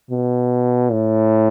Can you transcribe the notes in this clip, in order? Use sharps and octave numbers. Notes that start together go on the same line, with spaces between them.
B2
A2